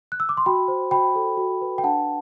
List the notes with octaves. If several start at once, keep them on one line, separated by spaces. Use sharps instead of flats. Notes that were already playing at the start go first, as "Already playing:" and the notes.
F#6
E6
D6
C6
F#4 G5 B5
C5
F#4 G5 B5
A4
F#4
B4
G5
D4 F#5 A5